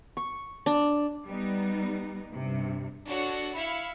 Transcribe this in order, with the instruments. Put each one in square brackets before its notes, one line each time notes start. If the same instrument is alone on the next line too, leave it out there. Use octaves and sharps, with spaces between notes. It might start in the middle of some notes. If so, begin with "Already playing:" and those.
[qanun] C#6
D4
[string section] G3 B3 D#4
G2 C3
[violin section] D4 F#4 A4 C#5 F#5
E4 E5 F5 B5 F6 C#7